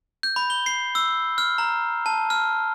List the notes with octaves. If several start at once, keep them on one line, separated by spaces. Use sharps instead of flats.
G6
B5
G7
C7
E6
F6
A#5
A5
F6